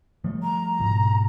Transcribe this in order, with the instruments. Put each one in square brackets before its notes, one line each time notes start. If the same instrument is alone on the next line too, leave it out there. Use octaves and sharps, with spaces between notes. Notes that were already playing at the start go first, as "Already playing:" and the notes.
[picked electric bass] F3 G3 A3
[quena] A#5
[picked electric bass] G#2 B2